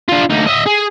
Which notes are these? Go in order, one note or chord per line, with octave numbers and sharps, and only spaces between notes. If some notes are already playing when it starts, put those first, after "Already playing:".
D4 F4
D2 D#4
D#5 E5
G#4